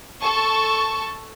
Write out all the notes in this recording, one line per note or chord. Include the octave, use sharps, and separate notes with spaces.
A4 A5 C#6